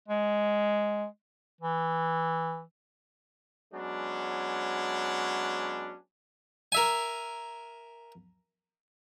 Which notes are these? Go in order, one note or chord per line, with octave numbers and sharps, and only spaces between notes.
G#3
E3
F#3 G#3 B3 C#4 D4
A#4 E5 G#5